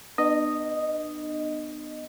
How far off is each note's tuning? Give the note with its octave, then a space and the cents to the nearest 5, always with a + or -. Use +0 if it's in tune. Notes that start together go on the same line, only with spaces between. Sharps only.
B3 +0 D4 +45 D#5 -5